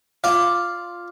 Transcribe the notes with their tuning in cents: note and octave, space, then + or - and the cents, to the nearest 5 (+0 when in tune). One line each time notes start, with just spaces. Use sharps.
F4 +0 D5 +0 F5 +0